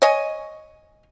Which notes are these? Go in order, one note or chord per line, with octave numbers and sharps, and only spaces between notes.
C#5 D#5 G#5